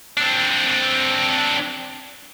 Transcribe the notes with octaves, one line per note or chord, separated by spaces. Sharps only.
C4 D4